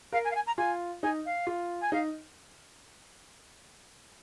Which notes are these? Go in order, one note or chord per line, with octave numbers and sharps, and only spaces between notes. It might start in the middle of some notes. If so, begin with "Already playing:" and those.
A#4 F5
G#5
F5
G#5
A#5
F4 G#5
D#4 G#5
F5
F4
G#5
D#4 F5